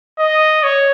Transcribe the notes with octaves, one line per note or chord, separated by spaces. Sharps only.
D#5
C#5